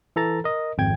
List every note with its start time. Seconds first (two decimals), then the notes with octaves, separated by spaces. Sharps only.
0.16 E3 A4 A#5 A6
0.44 A#4 D#5
0.78 G#1 F2 G5 G#6